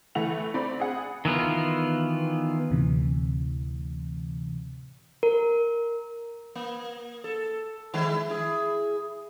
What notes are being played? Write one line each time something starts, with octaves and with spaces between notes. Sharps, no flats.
E3 A3 F#5 F7
C4 D5 B5
G#4 F#5
D#3 E3 B3 F4
D2 A2 C3 E3
A#4
A#3
A4
D#3 G#3 E4
E4 G#4